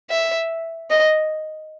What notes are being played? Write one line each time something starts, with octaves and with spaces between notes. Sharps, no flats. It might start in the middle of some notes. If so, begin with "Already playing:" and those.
E5
D#5